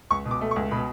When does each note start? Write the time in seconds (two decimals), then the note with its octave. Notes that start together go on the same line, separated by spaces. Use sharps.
0.11 C#2 C#6
0.26 B2
0.31 D6
0.41 A3
0.51 C#6
0.56 C#2
0.71 B2 B5